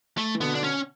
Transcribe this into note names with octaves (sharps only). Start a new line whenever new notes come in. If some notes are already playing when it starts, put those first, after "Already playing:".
A3
E3
B2 D3 B3
D4
C#4